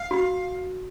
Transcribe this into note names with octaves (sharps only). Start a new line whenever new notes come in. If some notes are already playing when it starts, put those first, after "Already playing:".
Already playing: F5
F#4